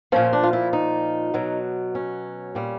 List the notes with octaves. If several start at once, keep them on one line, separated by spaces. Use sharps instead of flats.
A#2 F3 C#4
D4
F4
E4
D#4
B2 F#3
C#4
A#2 G3